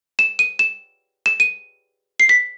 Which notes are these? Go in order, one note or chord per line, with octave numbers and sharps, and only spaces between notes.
E7
D#7
E7
E7
D#7
C7
B6